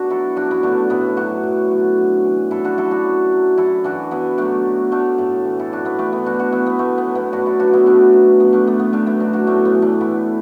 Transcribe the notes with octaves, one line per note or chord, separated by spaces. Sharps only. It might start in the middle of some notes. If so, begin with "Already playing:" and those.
Already playing: B2 D4 F#4
F#3 E4 A4
F#2 D4 F#4
B3 E4
D3 F#3 A3 D4
A2 B3 E4
F#3 D4 F#4
F#2
D3 F#3
F#2
E3
F#2 E4 A4
D4 F#4
F#3 E4 A4
D4 F#4
F#2
F#3
F#2 E4 A4
E3 D4 F#4
F#2 B3 E4
D3 F#3 A3 D4
B2
F#3 A3 D4
A2 A3
E3
E4 A4
F#2 D4 F#4
B3 E4
E3 A3 D4
B3 E4
B2 D4 F#4
D4 F#4
F#3 B3 E4
B3
B2 A3
B3
F#3
B3 E4
F#2 D4 F#4
E4 A4
D3 F#3 D4 F#4
B3 E4
B2 A3 D4
F#3
F#2 B3
A3 D4
F#3 B3
B3
B2 A3 D4
B3 E4
F#3 D4 F#4
D4 F#4
A2 A3 D4
B3
E3
A3 D4
A2 B3 E4